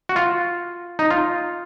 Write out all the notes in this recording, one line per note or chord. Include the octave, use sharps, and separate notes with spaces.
F#4
F4
D#4
F4